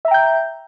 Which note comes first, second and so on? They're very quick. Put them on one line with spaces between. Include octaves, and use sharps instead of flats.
E5 A#5 G5 G6